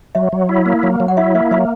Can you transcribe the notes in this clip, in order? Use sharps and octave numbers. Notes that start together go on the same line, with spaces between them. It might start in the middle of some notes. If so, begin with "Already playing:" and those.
F#3 E5
F#3
E4
A#3
F#3
F#3
F#5
E4 E5
A#3 E5
F#3 E5